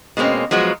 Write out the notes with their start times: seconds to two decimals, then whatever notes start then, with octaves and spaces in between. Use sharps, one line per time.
0.17 B2 G#3 A#3 C4 C#4
0.51 F3 F#3 G#3 B3 F#4